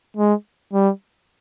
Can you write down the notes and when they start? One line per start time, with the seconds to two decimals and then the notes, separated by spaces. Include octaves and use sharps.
0.17 G#3
0.73 G3